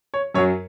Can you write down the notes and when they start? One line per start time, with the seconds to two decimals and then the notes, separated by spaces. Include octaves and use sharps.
0.14 C#5
0.34 F#2 C#5
0.38 F#3